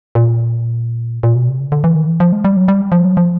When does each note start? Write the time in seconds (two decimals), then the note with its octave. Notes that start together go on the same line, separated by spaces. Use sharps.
0.15 A#2
1.23 A#2
1.36 B2
1.48 C3
1.60 C#3
1.72 D3
1.84 E3
1.96 D#3
2.08 E3
2.20 F3
2.32 G#3
2.45 G3
2.57 F#3
2.68 G3
2.92 F3
3.05 F#3
3.17 F3